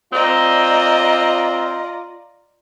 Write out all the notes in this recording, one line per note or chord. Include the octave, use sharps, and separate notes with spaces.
C4 F4 D5 D#5 A#5